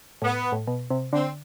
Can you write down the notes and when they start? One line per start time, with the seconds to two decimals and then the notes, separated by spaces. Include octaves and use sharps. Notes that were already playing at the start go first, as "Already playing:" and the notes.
0.22 A2 B3
0.52 A2
0.67 B2
0.90 C3
1.13 D3 C4